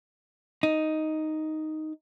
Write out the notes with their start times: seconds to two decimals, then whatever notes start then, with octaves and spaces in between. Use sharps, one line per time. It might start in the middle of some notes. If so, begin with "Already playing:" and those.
0.63 D#4